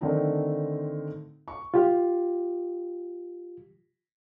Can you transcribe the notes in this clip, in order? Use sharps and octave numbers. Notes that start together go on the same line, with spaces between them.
D3 D#3 A3 C4 D#4
C#6
F4 G4